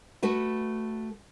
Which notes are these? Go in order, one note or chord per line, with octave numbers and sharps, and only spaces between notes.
A3 F#4 B4